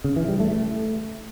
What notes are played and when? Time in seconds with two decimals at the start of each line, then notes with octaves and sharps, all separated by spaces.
0.04 C#3
0.16 E3
0.28 G3
0.40 A3
0.52 A3